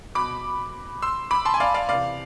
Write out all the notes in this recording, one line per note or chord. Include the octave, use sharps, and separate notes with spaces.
B2 B5 D6
C6 E6
B5 D6
A5 C6
G#5
D5 F5
D5 F5
C3 E3 D5 F5